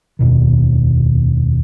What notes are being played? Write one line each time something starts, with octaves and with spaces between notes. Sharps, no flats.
F1 D#2 B2 D#3